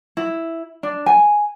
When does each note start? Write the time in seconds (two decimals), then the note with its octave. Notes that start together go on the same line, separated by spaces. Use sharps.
0.17 E4
0.83 D4
1.06 G#5